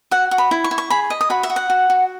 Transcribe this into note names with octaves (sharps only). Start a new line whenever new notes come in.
F#4 F#5
F#4
B5
E4
C#6
E4
C#6
G#4 B5
D#5
D#6
F#4 B5
E5
F#4
F#5
F#4
F#4